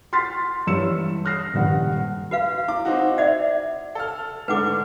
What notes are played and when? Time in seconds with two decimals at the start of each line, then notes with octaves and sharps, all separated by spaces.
0.13 C6 F6 A6 B6 C7
0.67 G2 E3 C#5 E6 C#7 E7
1.25 D#6 F6 F#6 A#6 C7
1.54 D#1 G2 F#5
2.31 F#4 B4 F5
2.68 E4 D6
2.85 C4 D#4 F#4
3.18 D5 E5 F#5 G#6
3.95 A4 F6
4.48 G#2 D3 A3 B4 F#5 D6